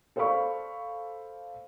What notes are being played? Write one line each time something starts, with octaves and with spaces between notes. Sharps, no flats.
A4 C5 D5 F5 B5 C#6